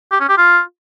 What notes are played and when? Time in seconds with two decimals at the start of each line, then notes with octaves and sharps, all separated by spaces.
0.12 G4
0.20 C#4
0.29 G4
0.38 F4